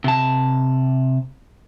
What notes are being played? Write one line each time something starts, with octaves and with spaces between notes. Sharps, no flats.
C3 A5